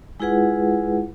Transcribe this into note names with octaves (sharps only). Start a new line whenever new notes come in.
G#3 E4 F4 G#4 B4 F#5